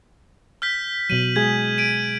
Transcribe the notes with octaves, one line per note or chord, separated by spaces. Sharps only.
F6 G6 B6
B2 F#3 D#7 F#7
G#3 G#4 G#6
D7 D#7